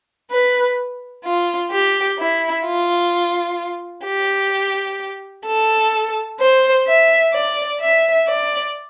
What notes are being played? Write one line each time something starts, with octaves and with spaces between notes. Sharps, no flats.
B4
F4
G4
E4
F4
G4
A4
C5
E5
D5
E5
D5